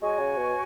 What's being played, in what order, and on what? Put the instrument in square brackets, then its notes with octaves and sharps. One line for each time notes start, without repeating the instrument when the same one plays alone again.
[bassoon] G#3 [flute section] F#4 C#5 G#5 C#6
[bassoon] C#3
B2